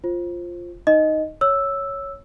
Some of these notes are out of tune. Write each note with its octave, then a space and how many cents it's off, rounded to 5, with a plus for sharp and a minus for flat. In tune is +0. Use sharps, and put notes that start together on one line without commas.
F4 +0 C5 +20
D#4 +0 D#5 +0
C#5 +0 E6 +0